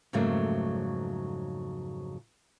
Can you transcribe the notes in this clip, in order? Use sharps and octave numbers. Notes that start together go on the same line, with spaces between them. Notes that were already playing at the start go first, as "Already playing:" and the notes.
F2 G#2 C#3 F#3 A3 A#3